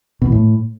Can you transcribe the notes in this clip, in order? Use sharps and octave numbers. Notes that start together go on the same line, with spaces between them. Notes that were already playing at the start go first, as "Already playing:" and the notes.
B2
E3
A2